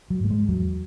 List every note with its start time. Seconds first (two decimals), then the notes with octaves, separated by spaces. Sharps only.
0.10 F#3
0.20 G#2 A3
0.30 G#3
0.48 E2 F#3